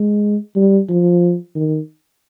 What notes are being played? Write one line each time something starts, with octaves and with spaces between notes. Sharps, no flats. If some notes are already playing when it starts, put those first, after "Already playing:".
Already playing: G#3
G3
F3
D#3